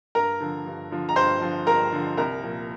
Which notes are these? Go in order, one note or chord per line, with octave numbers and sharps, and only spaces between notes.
G2 A#4 A#5
D3 F3
G2
D3 F3
A#5
G2 C5 C6
D3 F3
G2 A#4 A#5
D3 F3
C2 A#4 A#5
A#2 F3